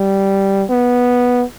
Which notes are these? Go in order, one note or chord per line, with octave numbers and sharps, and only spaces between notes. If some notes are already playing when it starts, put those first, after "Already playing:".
Already playing: G3
B3